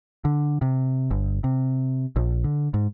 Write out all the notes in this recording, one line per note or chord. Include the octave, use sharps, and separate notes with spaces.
D3
C3
G1
C3
A#1
D3
G#2